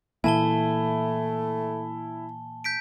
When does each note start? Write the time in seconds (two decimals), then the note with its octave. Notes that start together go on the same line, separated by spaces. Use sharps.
0.24 A#2 E3 A3 A#3 E4 G#5 A5 G7
2.64 G6 B6 D7